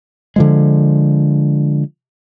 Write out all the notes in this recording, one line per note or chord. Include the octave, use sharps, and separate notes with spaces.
D3 F3 G#3